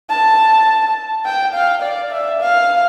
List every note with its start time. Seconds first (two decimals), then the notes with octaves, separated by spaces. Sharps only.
0.10 A5
1.25 G5
1.54 F5
1.83 D5
2.12 E5
2.41 F5